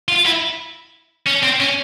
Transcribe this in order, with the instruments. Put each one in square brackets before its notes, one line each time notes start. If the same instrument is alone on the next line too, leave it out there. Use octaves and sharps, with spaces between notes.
[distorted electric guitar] F4
E4
C#4
C4
C#4